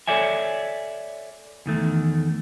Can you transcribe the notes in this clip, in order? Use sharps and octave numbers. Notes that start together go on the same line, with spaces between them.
A4 C#5 D5 E5 G#5
E2 D#3 A3